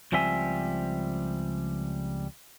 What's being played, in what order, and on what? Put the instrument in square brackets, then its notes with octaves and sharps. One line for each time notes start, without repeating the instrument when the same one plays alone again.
[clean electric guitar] C#2 F3 G3 C4 E5 G#5